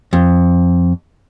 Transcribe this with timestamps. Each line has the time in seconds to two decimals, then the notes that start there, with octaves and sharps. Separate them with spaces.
0.13 F2